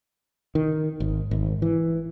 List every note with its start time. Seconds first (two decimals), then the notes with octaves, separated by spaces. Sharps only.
0.55 D#3
1.00 G#1
1.31 G#1
1.62 E3